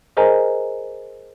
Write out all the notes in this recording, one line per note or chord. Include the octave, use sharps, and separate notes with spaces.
G#4 A#4 C5 D#5 G#5 A#5